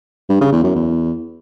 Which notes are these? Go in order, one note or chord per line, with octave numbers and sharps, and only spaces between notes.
G2
C#3
E2
F#2
E2